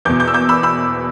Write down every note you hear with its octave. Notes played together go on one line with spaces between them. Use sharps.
E2 B2 D6 G6
D6 G6
E6
D6 G6
B5 E6
B5 E6